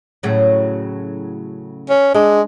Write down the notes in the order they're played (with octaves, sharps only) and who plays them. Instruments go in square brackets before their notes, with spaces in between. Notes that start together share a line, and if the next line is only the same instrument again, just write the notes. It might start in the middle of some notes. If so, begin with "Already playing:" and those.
[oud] A2 C#3 F#3
[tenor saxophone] C#4
[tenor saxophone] G#3 [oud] D4